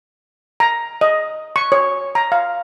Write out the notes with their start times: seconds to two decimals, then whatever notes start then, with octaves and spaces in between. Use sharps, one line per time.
0.60 A#5
1.01 D#5
1.56 C#6
1.72 C#5
2.15 A#5
2.32 F5